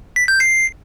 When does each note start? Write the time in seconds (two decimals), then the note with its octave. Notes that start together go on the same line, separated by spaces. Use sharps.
0.16 B6
0.28 G6
0.40 C7